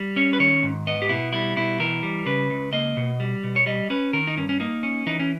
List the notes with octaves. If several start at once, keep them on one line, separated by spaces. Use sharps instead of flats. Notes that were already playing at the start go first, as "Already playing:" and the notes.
Already playing: G3
C#4 C#5
B4
D#3 C#5
G#2
B3 D#5
G4
B2 E4
G3 E4
B2 E4
E3 A#4
G3
C#3 B4
C#2
A#3 D#5
B2
G3
B2
C#5
G3 D#5
C#4 B4
D#3 A#4
D#4
G2 C#4
C#4
A#3 D#4
C#4
E3 D#4
C#4